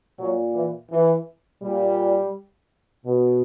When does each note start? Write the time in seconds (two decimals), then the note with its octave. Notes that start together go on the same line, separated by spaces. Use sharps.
0.18 A#2 F#3
0.54 E3
0.91 E3
1.62 A#2 G3
3.05 B2